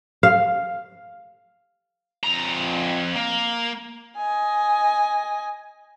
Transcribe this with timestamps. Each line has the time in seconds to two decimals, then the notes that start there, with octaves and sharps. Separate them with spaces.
0.23 F5
2.23 F2 A#5
3.15 A#3
4.16 D#5 G#5